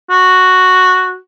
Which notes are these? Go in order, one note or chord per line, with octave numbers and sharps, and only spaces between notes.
F#4